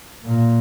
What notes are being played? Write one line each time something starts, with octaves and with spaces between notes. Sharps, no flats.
A#2